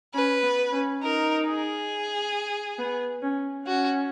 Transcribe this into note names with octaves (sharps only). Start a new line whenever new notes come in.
C#4 B4
B3
C#4
D#4 A#4
G#4
B3
C#4
C#4 F#4